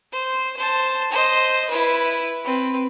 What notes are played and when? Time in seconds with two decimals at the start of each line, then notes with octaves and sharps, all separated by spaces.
0.12 C5
0.57 C5 A5
1.11 C5 D#5
1.70 E4 B4
2.44 C4 B4